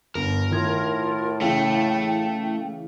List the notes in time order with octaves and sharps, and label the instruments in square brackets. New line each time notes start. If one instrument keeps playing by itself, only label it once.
[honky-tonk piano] G1 [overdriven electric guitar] A#4
[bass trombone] A2 [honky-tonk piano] D#3 G#6 [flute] F4
[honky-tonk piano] C#3 E3 [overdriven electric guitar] A3 [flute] G5